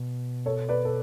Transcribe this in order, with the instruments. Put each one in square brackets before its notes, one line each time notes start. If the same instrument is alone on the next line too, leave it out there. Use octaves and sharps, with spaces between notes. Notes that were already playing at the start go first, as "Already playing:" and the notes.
Already playing: [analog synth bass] B2
[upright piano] A4 C#5
B4 D5
A4